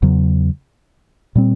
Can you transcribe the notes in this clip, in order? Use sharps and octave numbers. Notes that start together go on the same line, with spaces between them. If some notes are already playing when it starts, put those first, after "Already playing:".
E2 C#3 F#3
A#2 G3 C4